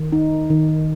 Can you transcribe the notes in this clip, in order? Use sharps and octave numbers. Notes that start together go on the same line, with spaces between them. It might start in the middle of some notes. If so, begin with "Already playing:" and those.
Already playing: D#3
D#4
D#3